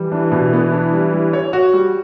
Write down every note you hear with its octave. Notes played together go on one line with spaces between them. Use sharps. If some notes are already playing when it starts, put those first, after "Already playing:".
Already playing: E3 G3
D4
B2
B3
D4
G3
G3
C#5
F#4
G3